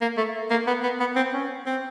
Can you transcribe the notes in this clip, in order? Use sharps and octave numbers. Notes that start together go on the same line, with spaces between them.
A#3
A3
A#3
B3
B3
B3
C4
C#4
C4